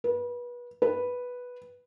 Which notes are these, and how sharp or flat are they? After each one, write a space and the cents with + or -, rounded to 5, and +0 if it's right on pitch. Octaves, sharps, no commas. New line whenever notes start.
B4 -30
B4 -5